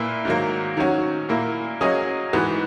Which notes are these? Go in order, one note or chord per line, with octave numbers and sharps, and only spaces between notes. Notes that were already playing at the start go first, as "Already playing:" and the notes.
Already playing: A#2 A#3 E4 B4 E5
G#2 D#3 F#3 A#3
D#3 F#3 C#4 F#4
A#2 A#3 E4
F#3 A#3 C#4 G#4 D#5
G#2 E3 B3 F#4